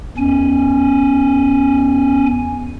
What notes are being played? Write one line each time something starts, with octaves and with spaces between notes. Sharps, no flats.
E2 C#4 G#5